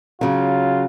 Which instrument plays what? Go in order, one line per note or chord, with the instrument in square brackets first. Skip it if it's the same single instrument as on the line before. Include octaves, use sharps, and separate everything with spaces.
[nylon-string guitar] C#3 F#3 [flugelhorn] F4